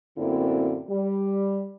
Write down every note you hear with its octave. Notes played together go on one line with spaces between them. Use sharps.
F#2 A2 D3 A#3 C4 E4
G3